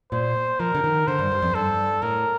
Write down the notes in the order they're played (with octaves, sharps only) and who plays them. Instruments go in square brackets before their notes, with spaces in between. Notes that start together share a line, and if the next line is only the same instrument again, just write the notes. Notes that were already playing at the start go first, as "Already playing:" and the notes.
[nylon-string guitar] A#2 [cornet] C5
[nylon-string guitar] F3 [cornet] A#4
[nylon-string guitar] D3
D#3
[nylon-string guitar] D3 [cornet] C5
[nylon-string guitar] G2
G2
F2
[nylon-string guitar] G2 [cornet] A4
[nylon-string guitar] A2 [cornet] A#4